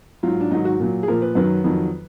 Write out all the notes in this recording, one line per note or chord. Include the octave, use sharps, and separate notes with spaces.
G#2 F#3 F4
D4
G#2 D#3 F#3 D#4
F#4
A#2 F#3
G#4
A#2 F3 A#4
B4
F#2 D#3 F#3 B4
F2 D#3 F#3